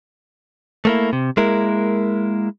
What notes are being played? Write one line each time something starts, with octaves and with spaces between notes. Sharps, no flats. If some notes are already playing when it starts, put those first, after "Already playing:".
A3 A#3 E4
C3
G#3 A#3 E4 A#4